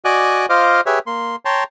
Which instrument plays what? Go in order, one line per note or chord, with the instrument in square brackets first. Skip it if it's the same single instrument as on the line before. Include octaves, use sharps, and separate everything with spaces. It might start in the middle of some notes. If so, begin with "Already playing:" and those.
[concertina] F#4 D5 D#5 G#5 D6 F#6
F4 C5 D#5 F5 D6
G4 G#4 B4 C#5 E5
A#3 C6
C#5 G5 A5 A#5 C6